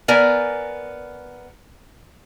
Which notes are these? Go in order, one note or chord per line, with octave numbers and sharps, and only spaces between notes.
B3 A#4 D5 G#5